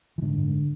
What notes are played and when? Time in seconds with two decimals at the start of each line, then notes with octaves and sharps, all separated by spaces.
0.18 E3
0.22 G#2 D3
0.38 G#2